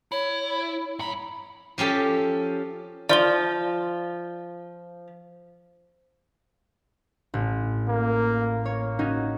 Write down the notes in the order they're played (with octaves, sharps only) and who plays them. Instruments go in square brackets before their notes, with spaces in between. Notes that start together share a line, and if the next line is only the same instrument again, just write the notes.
[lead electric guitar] E4 [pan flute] C#5
[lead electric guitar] G2 B5 [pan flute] A#5
[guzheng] F3 C#4 G4 A4
[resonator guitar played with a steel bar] F3 [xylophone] D5 C6 G7
[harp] A1
[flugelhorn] A#3
[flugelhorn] A#3 [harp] C#5
[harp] C#4 D#4 F#4